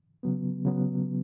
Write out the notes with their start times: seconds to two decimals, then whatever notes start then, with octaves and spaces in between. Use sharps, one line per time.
0.23 C#3 F#3 B3
0.65 C#3 F#3 B3